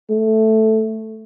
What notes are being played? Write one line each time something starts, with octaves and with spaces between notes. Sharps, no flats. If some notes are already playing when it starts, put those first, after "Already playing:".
A3